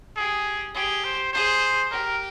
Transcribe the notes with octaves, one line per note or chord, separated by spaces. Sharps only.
G4 G#4
G4 G#4
C5
G#4 C5
G4 A#4